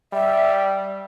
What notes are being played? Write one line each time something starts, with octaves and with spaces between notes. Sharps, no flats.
G3 E5